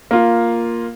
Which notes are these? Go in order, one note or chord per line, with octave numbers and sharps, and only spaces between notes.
A#3 F4